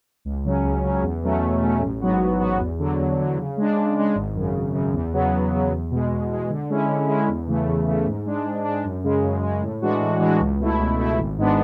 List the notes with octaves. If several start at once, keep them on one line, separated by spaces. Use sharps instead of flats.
C#2
C#3 F#3 C#4
C#2
C#3 F#3 C#4
E2
B2 F#3 A3 C#4
E2
B2 F#3 A3 C#4
A1
G#2 F#3 B3 F#4
A1
G#2 F#3 B3 F#4
E2
D3 F#3
E2
D3 F#3
C#3
G#3 D4
C#3
G#3 D4
G#1
F#2 C#3
G#1
F#2 C#3
E2
C#3 F#3 B3
E2
C#3 F#3 B3
E2
B2 G#3
E2
B2 G#3
D3
G#3 C#4 E4
D3
G#3 C#4 E4
E2
C#3 E3 A3
E2
C#3 E3 A3
G#2
G#3 D4
G#2
G#3 D4
F#2
C#3 G#3
F#2
C#3 G#3
A2
E3 G#3 D4 F#4
A2
E3 G#3 D4 F#4
C#2
B2 A3 E4
C#2
B2 A3 E4
G#1
G#2 G#3 B3 D4